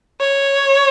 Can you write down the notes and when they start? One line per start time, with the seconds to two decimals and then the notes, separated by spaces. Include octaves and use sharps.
0.20 C#5